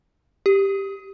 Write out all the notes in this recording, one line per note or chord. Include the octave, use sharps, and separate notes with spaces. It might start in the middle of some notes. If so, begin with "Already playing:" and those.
G4